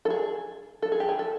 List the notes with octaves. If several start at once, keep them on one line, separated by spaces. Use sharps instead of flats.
A4
G#4
A4
G#4
G4
G#4
A4